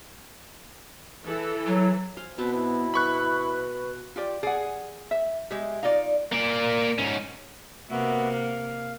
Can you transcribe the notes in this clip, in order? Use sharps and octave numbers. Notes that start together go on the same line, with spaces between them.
E3 A4
F#3
C5 F5 G#5
B2 B3 C4 B4 A5
E4
B4 B5 C#6 F#6
F4 G4 D5
G#4 D5 F#5
E5
G#3 G4 E5
D#4 F4 D5 D#5 F5
A#3 D5
G#2 C#4
C3 A#3 B3 F#4 E5
F5